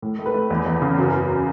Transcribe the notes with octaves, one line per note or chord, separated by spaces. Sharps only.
A2
A3
B4
A3
E2
E2
C#3
F#2
F#2